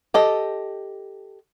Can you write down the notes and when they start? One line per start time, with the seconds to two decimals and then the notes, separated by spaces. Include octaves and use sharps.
0.14 G4 A4 D#5